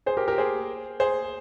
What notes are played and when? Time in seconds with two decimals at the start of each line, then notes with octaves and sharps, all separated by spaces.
0.06 G#4 C5
0.17 G4 A#4
0.28 G4 A#4
0.38 G#4 C5
1.00 G#4 C5